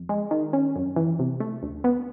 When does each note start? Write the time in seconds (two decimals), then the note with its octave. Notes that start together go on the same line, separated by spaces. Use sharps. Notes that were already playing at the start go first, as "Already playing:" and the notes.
Already playing: F2
0.09 G#3
0.31 D#3
0.53 C#4
0.76 F#2
0.96 E3
1.19 C3
1.40 A3
1.63 D2
1.84 B3